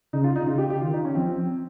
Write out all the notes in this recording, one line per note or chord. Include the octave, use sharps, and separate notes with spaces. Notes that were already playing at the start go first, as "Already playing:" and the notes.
C#3 D#4
F4
D#4
C#3 F4
G4
G4
D#3 F4
D#4
C#4
F3 C4